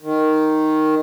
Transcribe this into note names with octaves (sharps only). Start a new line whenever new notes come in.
D#3